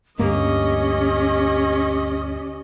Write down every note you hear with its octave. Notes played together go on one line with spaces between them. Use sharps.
D2 G2 A#3 C#4 G4 D#5